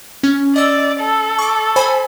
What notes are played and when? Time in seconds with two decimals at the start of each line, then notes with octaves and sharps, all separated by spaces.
0.23 C#4
0.56 D5 D#5 E6
1.01 A4
1.39 C#6 D6
1.76 C5 G#5 B5